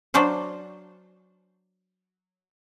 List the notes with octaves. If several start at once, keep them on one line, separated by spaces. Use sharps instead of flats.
F#3 D4 F#4 C5 F5